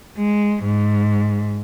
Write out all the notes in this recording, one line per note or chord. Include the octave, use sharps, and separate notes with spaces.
G#3
G#2